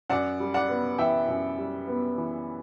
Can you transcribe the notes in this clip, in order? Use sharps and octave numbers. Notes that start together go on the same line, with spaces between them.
F#2 D5 F#5
G3
D5 F#5
B3
E3 E5 G5
F#2
G3
B3
E3